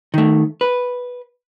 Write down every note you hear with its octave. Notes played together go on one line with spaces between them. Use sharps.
D#3 A3
B4